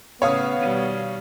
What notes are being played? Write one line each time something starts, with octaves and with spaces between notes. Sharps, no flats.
A2 C#3 B3 C#5 F5 D#6
B2 D#3 G3